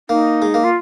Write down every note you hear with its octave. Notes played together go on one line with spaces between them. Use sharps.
A#3 D#4
G#3
A#3
F4